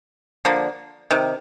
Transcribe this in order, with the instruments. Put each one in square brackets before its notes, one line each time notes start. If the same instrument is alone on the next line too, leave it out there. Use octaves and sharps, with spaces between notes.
[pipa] D3 F3 A#3
C3 D#3